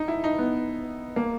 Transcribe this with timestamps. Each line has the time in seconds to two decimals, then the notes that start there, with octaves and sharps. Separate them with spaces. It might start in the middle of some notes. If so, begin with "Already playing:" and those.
Already playing: D#4
0.08 E4
0.24 D#4
0.38 B3
1.16 A#3